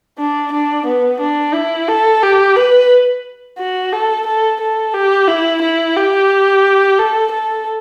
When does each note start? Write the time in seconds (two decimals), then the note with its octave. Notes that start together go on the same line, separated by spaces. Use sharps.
0.19 D4
0.53 D4
0.87 B3
1.21 D4
1.54 E4
1.89 A4
2.23 G4
2.56 B4
3.59 F#4
3.93 A4
4.27 A4
4.61 A4
4.94 G4
5.28 E4
5.62 E4
5.97 G4
6.99 A4
7.32 A4